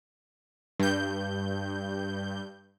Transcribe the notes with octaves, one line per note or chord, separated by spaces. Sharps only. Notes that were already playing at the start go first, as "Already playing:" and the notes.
G2 G6